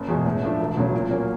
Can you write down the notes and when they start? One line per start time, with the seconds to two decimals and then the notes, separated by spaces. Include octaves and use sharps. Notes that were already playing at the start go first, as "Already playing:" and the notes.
Already playing: F#1
0.08 E2 B2 G#3
0.26 A2
0.43 F3 A3 D4
0.59 E1
0.77 D2 C#3 F#3
0.93 A#2
1.11 F#3 A#3 C#4